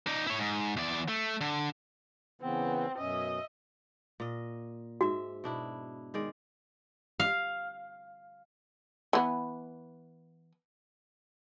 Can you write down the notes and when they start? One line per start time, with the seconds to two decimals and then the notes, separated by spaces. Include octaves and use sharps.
0.07 D#4 D5
0.27 E4 C#5
0.39 G#2
0.77 E2 D5
1.08 A3
1.41 D3
2.42 C#3 E3 B3 C4
2.98 F#2 B2 C#4 D#5 E5
4.20 A#2 D#5
5.01 G#2 F#4 E5
5.44 B2 D4 E4
6.14 D#3 G#3 D5
7.20 F5
9.13 E3 B3